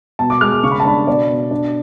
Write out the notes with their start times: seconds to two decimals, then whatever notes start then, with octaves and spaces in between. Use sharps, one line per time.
0.19 B2 A5
0.30 D6
0.41 G#3 F6
0.52 D6
0.63 C#3 C#6
0.72 B5
0.80 A5
0.85 D4 B5
1.07 B2 D5
1.29 B2
1.51 D4